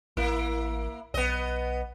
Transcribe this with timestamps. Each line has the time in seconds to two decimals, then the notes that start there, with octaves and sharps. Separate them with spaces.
0.17 A1 A#3 E4
1.14 B1 B3 D#5